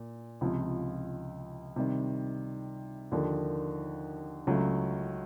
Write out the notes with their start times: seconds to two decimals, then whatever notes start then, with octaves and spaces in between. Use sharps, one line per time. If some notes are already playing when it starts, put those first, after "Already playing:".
Already playing: A#2
0.41 C#2 C3 F3
1.76 C3 D#3 G3
3.11 D#2 D3 F3 A#3
4.47 C#2 C#3 F#3 A3